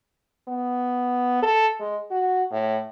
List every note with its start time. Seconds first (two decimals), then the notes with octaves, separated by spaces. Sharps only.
0.48 B3
1.42 A4
1.80 G#3
2.11 F#4
2.52 A2